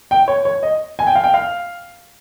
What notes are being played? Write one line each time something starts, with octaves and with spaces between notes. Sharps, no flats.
G5
C#5
C#5
D#5
G#5
G5
F5
G5
F5